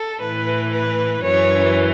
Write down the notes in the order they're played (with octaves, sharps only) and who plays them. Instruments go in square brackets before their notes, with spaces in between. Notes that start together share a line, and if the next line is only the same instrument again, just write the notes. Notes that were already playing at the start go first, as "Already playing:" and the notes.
Already playing: [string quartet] A4
A2 E3 B4
B4
F#2 E3 C#5